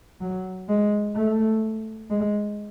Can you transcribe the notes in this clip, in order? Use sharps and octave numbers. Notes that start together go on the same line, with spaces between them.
F#3
G#3
A3
G#3